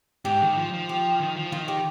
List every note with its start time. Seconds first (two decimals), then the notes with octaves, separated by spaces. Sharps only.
0.25 G#2 G4
0.42 D#3
0.57 F3
0.73 F3
0.89 G4
1.20 D#3
1.36 F3
1.52 D#3 F4
1.68 G4